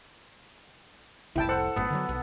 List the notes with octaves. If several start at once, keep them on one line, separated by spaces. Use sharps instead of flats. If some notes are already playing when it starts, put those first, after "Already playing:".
F1 C2 E4 G5 A5
A4 C5 F#5
F#1 F#2 A2 B3
D3 D#3 F#3
B1